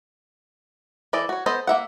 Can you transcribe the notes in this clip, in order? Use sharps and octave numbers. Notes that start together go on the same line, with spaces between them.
E3 A4 D5 D#5
F#4 C#5
B3 A4 C5 D#5
A#3 E5 F#5